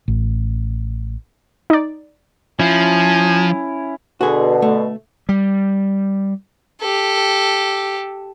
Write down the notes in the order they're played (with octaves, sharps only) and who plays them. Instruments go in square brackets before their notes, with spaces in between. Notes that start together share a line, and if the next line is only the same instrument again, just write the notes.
[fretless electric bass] A1
[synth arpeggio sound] D#4 D5
[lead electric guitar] F3 [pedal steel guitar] C#4 E4 [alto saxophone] G#5
[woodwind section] B2 D3 [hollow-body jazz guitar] F#4 G#4
[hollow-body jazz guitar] A3
[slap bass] G3
[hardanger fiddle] G4 A4